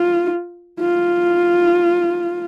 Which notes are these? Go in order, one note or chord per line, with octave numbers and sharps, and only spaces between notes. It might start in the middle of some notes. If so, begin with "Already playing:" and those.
Already playing: F4
F4